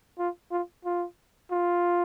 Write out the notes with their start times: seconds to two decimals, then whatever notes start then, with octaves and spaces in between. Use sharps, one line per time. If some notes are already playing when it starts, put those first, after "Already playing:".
0.19 F4
0.51 F4
0.85 F4
1.51 F4